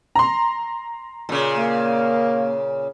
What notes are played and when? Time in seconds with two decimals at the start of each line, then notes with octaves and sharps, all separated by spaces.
0.15 A#5 C6
1.29 A#2 C#3
1.57 A#3